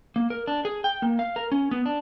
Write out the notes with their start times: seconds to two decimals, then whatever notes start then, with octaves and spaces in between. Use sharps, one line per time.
0.16 A#3
0.30 A#4
0.47 D4
0.65 G#4
0.84 G5
1.02 A#3
1.19 F5
1.36 A#4
1.52 C#4
1.71 B3
1.86 D4